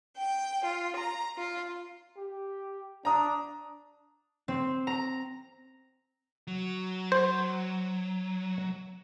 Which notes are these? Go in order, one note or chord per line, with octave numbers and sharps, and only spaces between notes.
G5
F4
A#5
F4
G4
D4 A#5 D#6
C4
A#5
F#3
C5